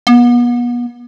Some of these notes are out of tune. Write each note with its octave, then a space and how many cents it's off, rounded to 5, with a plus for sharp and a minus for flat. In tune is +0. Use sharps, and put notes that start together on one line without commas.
B3 -35